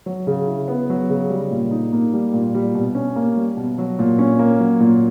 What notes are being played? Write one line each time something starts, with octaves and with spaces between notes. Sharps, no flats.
F#3
C#3
E4
B3
F#3
C#3
G3
A#2
D#4
A#3
G3
A#2
G3
B2
C#4
A#3
G3
B2
F#3
A#2
C#4
A#3
F#3
A#2